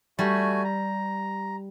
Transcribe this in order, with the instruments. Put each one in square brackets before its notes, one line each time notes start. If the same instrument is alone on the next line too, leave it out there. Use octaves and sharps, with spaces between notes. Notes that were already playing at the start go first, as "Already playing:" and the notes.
[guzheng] G3 [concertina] A3 F#4 G#5
[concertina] A#5